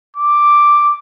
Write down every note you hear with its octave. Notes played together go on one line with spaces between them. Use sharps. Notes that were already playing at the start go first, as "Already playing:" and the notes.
D6